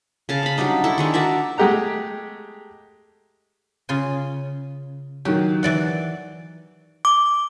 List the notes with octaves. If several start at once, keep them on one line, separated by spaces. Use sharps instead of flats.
C#3 F5 A5
F5 B5
F#3 G3 D4 D#4
E4 A4 C#6
D#3 G#3 D4
F#4 A#4 D5 E5
G#3 A3 G4 F#5 A#5
C#3 F4 G#5
D#3 F#3 G4
E3 D5 F#5
D6